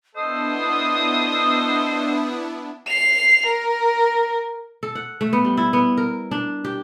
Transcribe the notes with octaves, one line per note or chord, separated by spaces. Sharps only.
B3 D4 E4 A4 C5 D#5 D#6
C7 F7
A#4
A4
F#5
A3
B3
G3
E4
B3
A#4
D4
G4